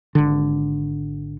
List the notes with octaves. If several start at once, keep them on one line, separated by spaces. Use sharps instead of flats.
G#1 D3